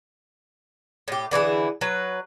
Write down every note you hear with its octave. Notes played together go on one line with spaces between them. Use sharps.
A2 G4
D3 E3 E4 G#4
F#3 B4